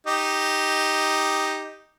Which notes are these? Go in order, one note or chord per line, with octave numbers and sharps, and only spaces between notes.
D#4 G4